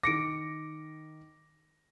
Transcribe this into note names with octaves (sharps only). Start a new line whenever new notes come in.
D#3 D6 A#6 C#7 D7